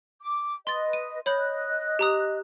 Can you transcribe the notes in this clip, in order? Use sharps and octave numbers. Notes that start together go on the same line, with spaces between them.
D6
B4 D#5 C6 A6
D#7
C#5 D#5 B5 F#6 G6
G4 A#5 D#6